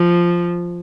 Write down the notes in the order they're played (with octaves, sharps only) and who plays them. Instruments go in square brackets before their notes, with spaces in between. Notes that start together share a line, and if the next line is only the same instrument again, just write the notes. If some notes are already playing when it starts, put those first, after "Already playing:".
Already playing: [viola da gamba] F3